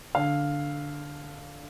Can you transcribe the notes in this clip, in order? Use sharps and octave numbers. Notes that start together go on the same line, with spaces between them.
D3 F5